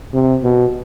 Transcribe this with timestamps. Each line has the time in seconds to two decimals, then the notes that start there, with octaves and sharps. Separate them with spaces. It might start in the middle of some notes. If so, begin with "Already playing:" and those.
0.14 C3
0.43 B2